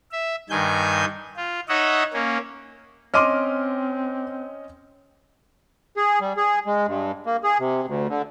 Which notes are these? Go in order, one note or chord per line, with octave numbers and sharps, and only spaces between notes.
E5
G2 D#3 G#5 G6
F4
D#4 C#5 D#5 E5 F#5
A#3 C#4
C4 C#4 D#5 C6 D6 F6 D#7
G#4
G3
G#4
G#3
G2
A#3
G#4
C3
D2
D3